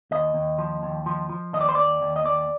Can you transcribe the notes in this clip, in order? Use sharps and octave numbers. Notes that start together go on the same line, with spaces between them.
D#2 D#5
D#2
F3
D#2
F3
F3
D#2 D#5
D5
C5
D#2 D5
D#2
D#5
D#2 D5